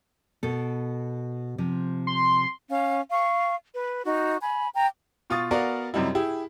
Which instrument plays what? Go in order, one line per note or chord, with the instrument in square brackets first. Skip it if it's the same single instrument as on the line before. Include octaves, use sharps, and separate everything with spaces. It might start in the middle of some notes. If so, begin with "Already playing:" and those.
[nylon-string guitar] B2 A4
C3 F3
[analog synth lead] C6
[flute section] C#4 F5
F5 C#6
B4
D#4 F#4
G#5 B5
G5 A#5
[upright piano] B2 F4 C#6 D#6 A6
B3 F#4 A#4 D5 F5
F#2 C3 G3 D#4 E4
E4 G4 G#4